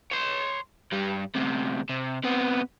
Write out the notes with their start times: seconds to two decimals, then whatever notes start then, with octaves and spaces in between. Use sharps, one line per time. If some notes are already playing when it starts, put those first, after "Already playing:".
0.12 C#5 C6
0.92 G2 G3
1.35 D2 C3
1.89 C3
2.24 C3 B3